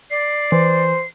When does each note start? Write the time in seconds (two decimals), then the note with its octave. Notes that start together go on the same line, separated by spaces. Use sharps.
0.11 D5 C7
0.52 E3 C5